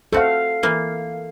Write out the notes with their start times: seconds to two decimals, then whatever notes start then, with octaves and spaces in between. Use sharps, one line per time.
0.13 A3 C4 F#4 A4 F5
0.63 E3 A#3